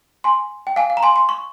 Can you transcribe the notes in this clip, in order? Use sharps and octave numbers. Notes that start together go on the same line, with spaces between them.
G#5 C6
G5
F5 G#5
F5
A#5
G#5 C6
C6
C#6